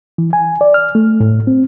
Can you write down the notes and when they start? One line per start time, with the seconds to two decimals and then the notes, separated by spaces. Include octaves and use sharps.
0.18 E3
0.33 G#5
0.61 D5
0.74 F6
0.95 A3
1.20 A2
1.47 C4